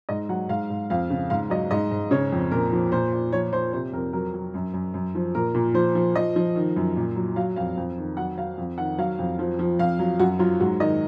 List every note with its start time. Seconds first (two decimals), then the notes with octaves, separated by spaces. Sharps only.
0.09 G#2 D#5
0.29 F#3 F#5
0.49 G#2 F5
0.70 G#2
0.90 F2 F5
1.10 C#3
1.30 G#2 F5
1.50 F#3 D#5
1.71 G#2 D#5
1.91 G#2
2.11 C#3 C#5
2.32 F2
2.52 A#2 A#4
2.72 F3
2.92 A#2 C5
3.13 A#2
3.32 F3 C#5
3.52 F3 C5
3.73 C3 C5
3.93 F2 A#4
4.13 F#3 A#4
4.34 F#3
4.54 F#2
4.74 F#2
4.94 F#2
5.15 F3
5.35 A#2 A#4
5.54 A#2
5.74 F3 C5
5.95 F3
6.15 F3 D#5
6.36 F3
6.55 D#3
6.76 F#2
6.96 A#2
7.16 F#3
7.36 F#3 F5
7.56 F2 F5
7.77 F2
7.98 D#3
8.17 F#3 F#5
8.37 F#3 F5
8.58 F2
8.78 D#3 F#5
8.98 F#3 F5
9.19 F2
9.39 F3
9.59 F3
9.79 F2 F5
9.99 F#3
10.19 F#2 F#4
10.39 F#3 F4
10.60 G#2 F#4
10.80 D#3 D#5